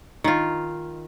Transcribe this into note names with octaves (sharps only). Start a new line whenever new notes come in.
D#3 F4